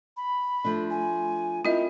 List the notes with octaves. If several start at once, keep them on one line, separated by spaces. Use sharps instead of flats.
B5
F3 A3 D4
G#5
C4 E4 F4 A#4 D#5